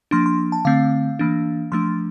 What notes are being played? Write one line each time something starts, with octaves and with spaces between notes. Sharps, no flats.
F3 A#3 D4 C6
C6
A5
D3 A3 C4 F5
E3 A#3 D4
F3 A3 D4 C6